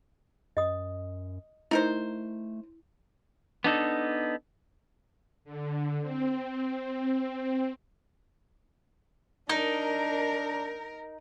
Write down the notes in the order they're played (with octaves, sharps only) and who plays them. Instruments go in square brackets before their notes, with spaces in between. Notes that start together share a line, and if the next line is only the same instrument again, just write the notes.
[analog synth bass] F#2 [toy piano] D#5 D#6
[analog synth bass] A3 [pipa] D#4 A#4 C5 [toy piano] E4
[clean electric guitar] B3 D4 D#4 A4
[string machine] D3
C4
[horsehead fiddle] D4 [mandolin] D#4 [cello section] A#4